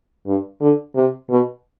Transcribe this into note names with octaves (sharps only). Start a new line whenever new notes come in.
G2
D3
C3
B2